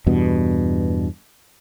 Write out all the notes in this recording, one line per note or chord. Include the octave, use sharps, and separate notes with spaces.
E2 G2 B2